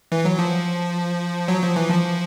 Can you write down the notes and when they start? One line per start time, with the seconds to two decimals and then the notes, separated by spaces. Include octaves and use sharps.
0.12 E3
0.25 F#3
0.39 F3
1.48 F#3
1.62 F3
1.76 E3
1.90 F3